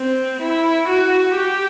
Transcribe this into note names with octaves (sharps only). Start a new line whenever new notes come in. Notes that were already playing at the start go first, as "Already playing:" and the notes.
Already playing: C4
E4
F#4
G4